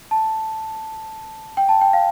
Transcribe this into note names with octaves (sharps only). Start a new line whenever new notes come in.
A5
G5
A5
G5
F5